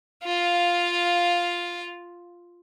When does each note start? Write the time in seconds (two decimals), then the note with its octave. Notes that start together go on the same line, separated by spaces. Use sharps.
0.23 F4 F5